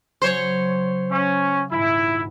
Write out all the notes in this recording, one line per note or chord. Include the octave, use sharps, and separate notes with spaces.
C#3 F#3 C5 C#5 B5
C#4 G#4 F5
D#1 G#2 E4